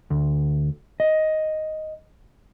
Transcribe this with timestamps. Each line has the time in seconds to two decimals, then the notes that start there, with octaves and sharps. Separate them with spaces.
0.10 D2
1.00 D#5